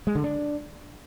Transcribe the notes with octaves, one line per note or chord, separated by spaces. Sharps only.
G#3
D3
D4